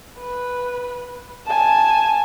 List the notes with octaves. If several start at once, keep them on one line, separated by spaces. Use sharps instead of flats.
B4
G#5 A5